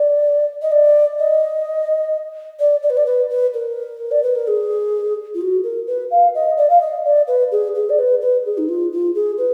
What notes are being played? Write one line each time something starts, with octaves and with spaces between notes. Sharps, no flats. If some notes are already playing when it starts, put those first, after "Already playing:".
Already playing: D5
D#5
D5
D#5
D5
D5
B4
D5
B4
B4
A#4
D5
B4
A#4
G#4
F4
F#4
A#4
B4
F5
D#5
D5
F5
D#5
D5
B4
G#4
G#4
D5
B4
B4
G#4
D#4
F4
F4
G#4
B4